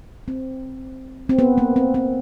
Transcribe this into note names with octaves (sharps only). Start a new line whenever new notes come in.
C4
C4
B3
A#3
C4
C4